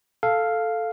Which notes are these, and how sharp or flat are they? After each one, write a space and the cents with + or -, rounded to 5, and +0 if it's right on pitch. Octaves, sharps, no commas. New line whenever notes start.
A4 +0 F5 +0